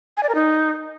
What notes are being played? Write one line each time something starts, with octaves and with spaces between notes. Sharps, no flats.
G#5
D5
A#4
D#4